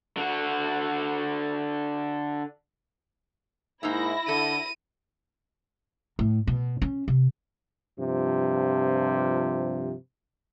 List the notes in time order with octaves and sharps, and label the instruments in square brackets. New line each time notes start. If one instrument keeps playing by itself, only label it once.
[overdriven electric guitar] D3 F#4
[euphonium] G#2 [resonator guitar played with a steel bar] A#3 D#4 E5 [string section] E4 A#6
[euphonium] D3 [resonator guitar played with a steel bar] A4 E5 [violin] D#7
[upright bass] A2
B2
C#4
C3
[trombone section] G2 C3 F3